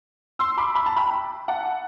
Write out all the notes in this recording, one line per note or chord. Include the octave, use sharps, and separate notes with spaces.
C6 E6
B5 D6
B5
A5
G5 B5
F#5 A5